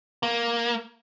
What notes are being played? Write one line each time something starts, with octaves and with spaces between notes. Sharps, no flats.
A#3